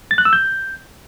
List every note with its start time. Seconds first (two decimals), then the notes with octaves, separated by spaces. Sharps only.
0.11 A6
0.18 F#6
0.25 E6
0.33 G6